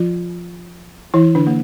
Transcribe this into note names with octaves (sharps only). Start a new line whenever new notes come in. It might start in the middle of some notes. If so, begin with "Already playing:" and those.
Already playing: F3 F4
E3 E4
D3 D4
A#3